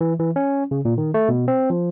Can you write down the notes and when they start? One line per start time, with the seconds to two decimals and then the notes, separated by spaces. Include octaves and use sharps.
0.01 E3
0.19 E3
0.36 C#4
0.71 C#3
0.85 A#2
0.98 D#3
1.14 A3
1.29 B2
1.48 C4
1.70 F3